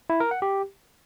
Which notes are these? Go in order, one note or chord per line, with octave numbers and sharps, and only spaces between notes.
E4
A#4
F#5
G4